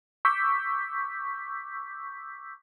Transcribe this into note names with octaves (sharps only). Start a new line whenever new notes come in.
C#6 D6 E6 G6 B6